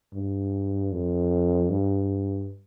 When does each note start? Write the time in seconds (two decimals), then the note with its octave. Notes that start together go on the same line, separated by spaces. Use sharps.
0.13 G2
0.92 F2
1.70 G2